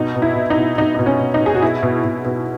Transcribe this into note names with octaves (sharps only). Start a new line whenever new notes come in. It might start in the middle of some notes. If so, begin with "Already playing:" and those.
Already playing: B2 D#4
B2
E4
B2
D#4
B2
B2 D#4
B2 D#4
C#4
B2
D#4
B2 G#4
F#4
B2 E4
B2
B2
B2